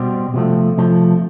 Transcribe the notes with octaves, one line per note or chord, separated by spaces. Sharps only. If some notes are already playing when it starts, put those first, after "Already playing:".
Already playing: B2 G3 C4
C3 F3 A3
C3 F3 A3